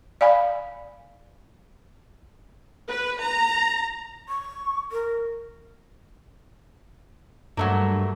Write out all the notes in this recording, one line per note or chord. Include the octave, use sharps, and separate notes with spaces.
D5 F5 G#5 B5
B4
A#5
C#6
A#4
G2 F#3 A3 A#3